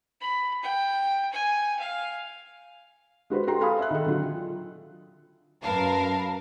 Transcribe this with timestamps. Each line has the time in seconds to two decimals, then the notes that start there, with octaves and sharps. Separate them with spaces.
0.21 B5
0.63 G5
1.33 G#5
1.79 F5
3.30 G#3 F#4 B4 C5
3.47 F#4 A4 G5 A#5 C6
3.61 A4 F5 G#5 B5 D#6
3.79 E5 F#6
3.91 D#3 A4
4.06 D3 F#3 F4
5.63 F#2 A#4 B4 F5 A5